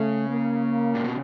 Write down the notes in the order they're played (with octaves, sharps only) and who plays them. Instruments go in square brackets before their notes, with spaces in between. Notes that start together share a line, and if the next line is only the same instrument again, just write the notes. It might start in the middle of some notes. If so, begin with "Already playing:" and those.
Already playing: [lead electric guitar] C#3 [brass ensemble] A3
[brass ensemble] A#3
[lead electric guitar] A#2
B2